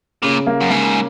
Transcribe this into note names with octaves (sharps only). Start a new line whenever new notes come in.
A#2 C#3
A#3
F#2
G#2 A#3